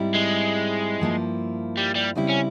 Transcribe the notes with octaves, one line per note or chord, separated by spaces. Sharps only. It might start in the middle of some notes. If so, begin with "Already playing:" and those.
Already playing: G#2 G3 C4 E4
G#3
G2 F3 A#3 E4
G3
G3
C#3 G3 C4 E4
C#4